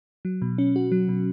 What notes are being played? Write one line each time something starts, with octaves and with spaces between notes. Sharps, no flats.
F#3
B2
C#4
F#4
F#3
B2